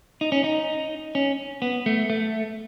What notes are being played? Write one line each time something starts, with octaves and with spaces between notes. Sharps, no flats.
D#4
C#4
D#4
C#4
B3
A3
A3